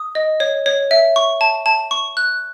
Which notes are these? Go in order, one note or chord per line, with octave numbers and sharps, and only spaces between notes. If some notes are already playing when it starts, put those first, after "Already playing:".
Already playing: D#6
D#5
C#5
C#5
E5
C#6
A5
A5
C#6
F#6